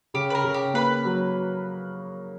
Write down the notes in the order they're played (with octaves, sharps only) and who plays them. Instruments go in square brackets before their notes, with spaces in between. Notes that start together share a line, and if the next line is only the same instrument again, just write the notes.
[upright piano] C#3 [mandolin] G4
[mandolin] B4
A#4
[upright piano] C#3
[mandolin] G4
[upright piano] A#3 [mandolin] B4
[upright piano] F#3